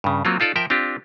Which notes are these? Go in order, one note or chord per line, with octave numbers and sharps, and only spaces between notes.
G2 C#3
F#3 A#3 C4 F4
D#4 F4 A4 D5
F3 A#4 E5 G5
C4 D4 F4 G4